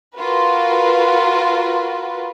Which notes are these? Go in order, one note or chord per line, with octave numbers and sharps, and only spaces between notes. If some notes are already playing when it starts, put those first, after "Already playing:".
F4 F#4 A#4 B4